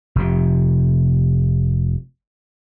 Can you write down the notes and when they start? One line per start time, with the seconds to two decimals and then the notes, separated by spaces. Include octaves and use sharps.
0.16 F1 F2 C3